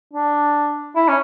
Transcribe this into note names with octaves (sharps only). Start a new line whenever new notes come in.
D4
E4
C#4